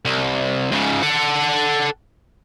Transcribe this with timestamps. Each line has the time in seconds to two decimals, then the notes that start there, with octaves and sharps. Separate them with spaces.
0.05 C2
0.72 G#2 C#3
1.03 A4 F#5